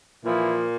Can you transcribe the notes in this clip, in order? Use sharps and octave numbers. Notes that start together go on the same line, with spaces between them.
A#2 E3 F3 A#3 E4